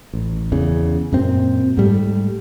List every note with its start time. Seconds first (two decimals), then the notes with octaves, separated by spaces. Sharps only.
0.13 A1
0.52 E2 C#3
1.12 F#2 A#2 C4
1.77 G#2 G3 A3